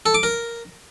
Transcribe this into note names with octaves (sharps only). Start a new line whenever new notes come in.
A4
D6
A#4